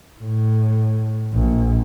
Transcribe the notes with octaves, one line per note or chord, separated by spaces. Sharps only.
A2
A#1